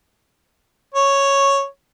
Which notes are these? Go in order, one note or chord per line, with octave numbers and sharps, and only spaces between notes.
C#5